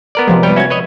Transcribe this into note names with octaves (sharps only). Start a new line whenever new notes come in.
B3 A#4 D5
C3 F3 G#3
G3 B3 C#5 G5
C#4 F#4 E5 G#6
B4 C#5 D#5